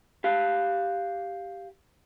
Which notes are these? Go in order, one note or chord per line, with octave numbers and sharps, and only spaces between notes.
G4 F5